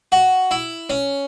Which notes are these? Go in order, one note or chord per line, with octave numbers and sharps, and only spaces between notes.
F#4
E4
C#4